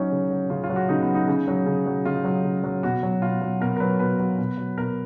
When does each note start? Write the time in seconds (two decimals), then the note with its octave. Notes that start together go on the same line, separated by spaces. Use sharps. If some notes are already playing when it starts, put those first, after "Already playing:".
Already playing: F#3 C#4 D#4
0.11 C#3
0.30 F#3
0.50 C#3 F4
0.64 F4
0.70 F#3
0.76 F#4
0.89 C#3 D#4
1.02 B3
1.08 F#3
1.15 D#4
1.28 C#3
1.48 F#3
1.66 C#3
1.86 F#3
2.05 C#3 F4
2.24 F#3
2.44 C#3
2.64 F#3
2.83 B2 F#4
3.03 F#3
3.22 B2 F4
3.41 F#3
3.61 B2 A#4
3.77 A#4
3.80 F#3 B4
4.00 B2 B4
4.20 F#3
4.38 B2
4.58 F#3
4.77 B2 A#4